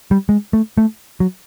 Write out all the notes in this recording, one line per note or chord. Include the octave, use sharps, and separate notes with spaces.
G3
G#3
A3
A3
F#3